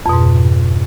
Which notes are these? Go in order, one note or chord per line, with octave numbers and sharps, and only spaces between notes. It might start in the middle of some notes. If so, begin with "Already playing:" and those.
F2 G#2 B2